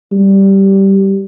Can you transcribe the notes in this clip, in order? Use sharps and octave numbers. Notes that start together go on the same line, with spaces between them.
G3